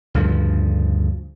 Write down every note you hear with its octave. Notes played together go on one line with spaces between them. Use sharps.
D2 G2 C#3 F3